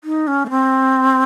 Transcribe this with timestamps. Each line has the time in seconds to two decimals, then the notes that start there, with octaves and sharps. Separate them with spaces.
0.04 D#4
0.27 C#4
0.46 A3
0.50 C4